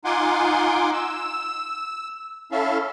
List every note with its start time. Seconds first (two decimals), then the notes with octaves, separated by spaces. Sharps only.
0.05 D#4 F4 F#5 G#5 C6 D6
0.93 E6
2.52 C#4 E4 A4 E5 F5